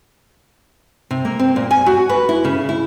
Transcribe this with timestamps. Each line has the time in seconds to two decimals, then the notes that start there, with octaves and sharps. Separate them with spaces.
1.11 C3
1.25 A#3
1.39 C4
1.56 A#2
1.71 G#5
1.86 F#4
2.09 B4
2.29 E4
2.45 C#3
2.69 E4